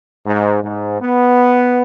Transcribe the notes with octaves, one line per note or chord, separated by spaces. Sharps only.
G#2
G#2
B3